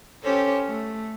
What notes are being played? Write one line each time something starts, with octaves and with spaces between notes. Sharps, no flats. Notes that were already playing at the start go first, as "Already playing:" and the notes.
C#4 G4 A4 C5 C#5
A3